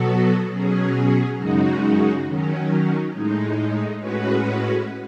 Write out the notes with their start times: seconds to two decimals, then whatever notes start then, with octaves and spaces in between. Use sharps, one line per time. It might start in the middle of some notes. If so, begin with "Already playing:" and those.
Already playing: B2 F#3 B3 F#4 A4
0.50 B2 F#3 C#4 G#4
1.37 F#2 C#3 G#3 D#4 F#4
2.24 D#3 F#3 C#4
3.12 A2 G#3 D#4
4.00 A2 G#3 C#4 F#4 B4